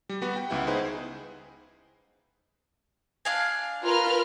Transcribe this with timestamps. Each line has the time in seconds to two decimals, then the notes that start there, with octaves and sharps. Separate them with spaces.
0.09 G3
0.22 G3 B3 F#4 B4
0.36 G5
0.50 C#2 B3 E4 F#5
0.67 D#4 E4 G#4 B4 C5
3.25 D4 F5 G#5
3.84 F4 A#4 B4 F6